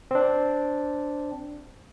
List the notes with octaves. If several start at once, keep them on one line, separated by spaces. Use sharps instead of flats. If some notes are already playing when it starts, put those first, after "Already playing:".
C4 D4